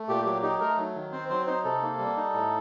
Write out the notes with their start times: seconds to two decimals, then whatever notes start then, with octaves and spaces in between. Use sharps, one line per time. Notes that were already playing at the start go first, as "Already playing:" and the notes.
Already playing: A3
0.08 A#2 G4
0.25 F#3 G4
0.43 D#4 G4
0.60 A3 A#4
0.77 F#3
0.95 D#3
1.12 C4 C5
1.30 F#3 C5
1.47 D#4 C5
1.65 C3 A4
1.82 A#3
1.99 G3
2.17 D#4
2.34 A2